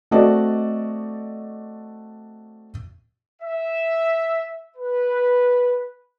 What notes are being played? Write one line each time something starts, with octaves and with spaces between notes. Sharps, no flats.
A3 C4 F#4 D5 D#5
E5
B4